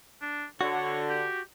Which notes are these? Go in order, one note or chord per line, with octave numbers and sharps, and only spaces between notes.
D4
D3 F#4 C#5
G4